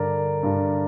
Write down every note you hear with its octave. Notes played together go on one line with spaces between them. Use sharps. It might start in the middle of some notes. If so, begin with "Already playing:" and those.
Already playing: G2 D3 A#4 D5
G2 D3